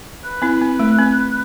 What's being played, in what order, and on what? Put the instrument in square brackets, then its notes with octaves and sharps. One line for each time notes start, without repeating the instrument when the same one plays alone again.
[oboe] B4
[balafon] C4 E4
C4
A3
C4